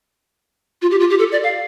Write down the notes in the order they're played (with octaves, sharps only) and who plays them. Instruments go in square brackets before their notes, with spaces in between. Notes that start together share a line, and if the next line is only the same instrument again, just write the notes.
[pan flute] F4
G4
F4
G4
A4
D5
F5